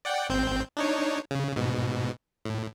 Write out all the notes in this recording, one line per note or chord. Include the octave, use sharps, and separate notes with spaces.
D5 F#5 G5
G#1 C4 G6
D4 D#4 C#5
C#3
G#2 B2
A2